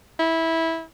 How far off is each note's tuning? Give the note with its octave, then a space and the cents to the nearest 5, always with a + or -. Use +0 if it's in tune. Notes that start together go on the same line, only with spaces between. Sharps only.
E4 -15